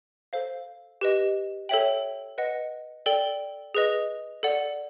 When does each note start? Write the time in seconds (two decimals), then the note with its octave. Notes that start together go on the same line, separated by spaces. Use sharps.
0.33 A4 C5 F5
1.01 G4 B4 D#5
1.69 A4 C#5 E5 G5 F#7
2.38 B4 D#5 F#5
3.06 A4 D5 G5 G7
3.75 G#4 B4 D#5
4.43 A4 D5 F#5